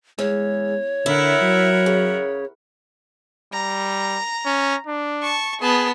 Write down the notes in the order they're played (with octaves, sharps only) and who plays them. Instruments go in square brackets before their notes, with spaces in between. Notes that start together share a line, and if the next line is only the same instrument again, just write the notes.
[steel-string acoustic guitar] E2 [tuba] G#3 [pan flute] C#5
[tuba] D3 [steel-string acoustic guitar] E4 [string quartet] A#4 E5 F#5
[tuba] F#3
[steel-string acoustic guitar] C#3
[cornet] G3 [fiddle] A#5
[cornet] C#4
D4
[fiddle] A5 C#6
[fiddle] B3 A5 [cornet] G#4